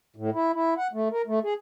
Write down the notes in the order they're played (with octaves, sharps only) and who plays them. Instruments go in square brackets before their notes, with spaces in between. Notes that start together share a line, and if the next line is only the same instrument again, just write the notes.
[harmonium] A2
E4
E4
F#5
A3
A#4
A3
G#4